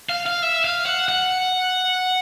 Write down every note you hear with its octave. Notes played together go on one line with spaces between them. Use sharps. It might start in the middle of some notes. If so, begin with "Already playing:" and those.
F5
F5
E5
F5
F#5
F#5